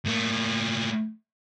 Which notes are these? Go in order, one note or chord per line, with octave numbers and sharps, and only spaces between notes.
A2 A#3